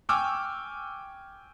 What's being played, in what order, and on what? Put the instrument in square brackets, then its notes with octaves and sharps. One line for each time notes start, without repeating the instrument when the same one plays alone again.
[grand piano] G5 G#5 C#6 D6 E6 F6